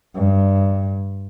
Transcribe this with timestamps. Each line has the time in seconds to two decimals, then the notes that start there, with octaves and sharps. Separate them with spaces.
0.16 G2